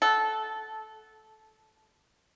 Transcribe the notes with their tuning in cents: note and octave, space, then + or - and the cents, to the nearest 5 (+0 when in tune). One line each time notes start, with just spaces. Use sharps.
A4 -15 F#5 +10